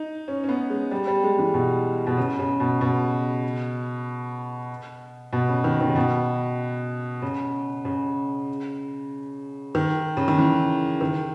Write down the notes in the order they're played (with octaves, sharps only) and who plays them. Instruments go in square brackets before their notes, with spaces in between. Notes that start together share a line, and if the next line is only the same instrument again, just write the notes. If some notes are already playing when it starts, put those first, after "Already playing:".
Already playing: [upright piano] D#4
C#4
C#4
B3
G#3
G3
G3
G#3
E3
B2
B2
C#3
C#3
B2
B2
B2
C#3
D#3
D#3
C#3
B2
C#3
C#3
D#3
C#3
D#3
E3
D#3